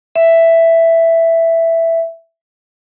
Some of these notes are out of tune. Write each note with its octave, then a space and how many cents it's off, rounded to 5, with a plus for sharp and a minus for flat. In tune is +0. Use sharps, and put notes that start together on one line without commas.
E5 +5